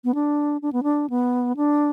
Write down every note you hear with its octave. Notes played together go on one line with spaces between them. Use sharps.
B3
D4
D4
B3
D4
B3
D4